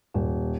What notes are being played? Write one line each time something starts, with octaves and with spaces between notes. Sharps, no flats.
D#1